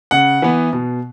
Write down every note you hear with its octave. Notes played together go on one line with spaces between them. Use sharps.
C#3 F#5
E3 B3
B2